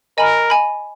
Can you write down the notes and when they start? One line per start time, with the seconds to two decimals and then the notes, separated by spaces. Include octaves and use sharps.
0.17 A#4 D#5 G#5 B5
0.50 D#5 G#5 B5